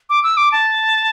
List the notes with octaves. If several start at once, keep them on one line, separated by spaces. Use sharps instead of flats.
D6
E6
D6
A5